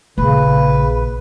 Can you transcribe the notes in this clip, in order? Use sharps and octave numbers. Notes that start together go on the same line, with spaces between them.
A#1 C#3 B4